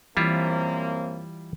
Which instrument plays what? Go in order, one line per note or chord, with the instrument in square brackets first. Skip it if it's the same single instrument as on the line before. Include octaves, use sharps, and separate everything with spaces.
[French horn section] F#2 A#3 C4 [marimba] E3 [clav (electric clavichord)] G3 E4 F4